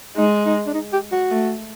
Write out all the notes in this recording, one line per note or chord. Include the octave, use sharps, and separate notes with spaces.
G#3 D#4
D#4
D4
D#4
G4
F#4
A3